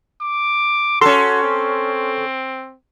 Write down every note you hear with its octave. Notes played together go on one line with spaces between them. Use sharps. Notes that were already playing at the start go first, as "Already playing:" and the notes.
D6
C#4 F#4 A4 C6
C4